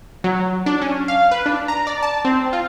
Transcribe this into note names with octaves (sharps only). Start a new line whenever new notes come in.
F#3
D4
C#4
F5
B4
D4
A#5
D5
A5
C4
F4